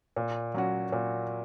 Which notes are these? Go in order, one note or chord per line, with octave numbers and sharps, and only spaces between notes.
A#2
F#3 C#4 F#4
A#2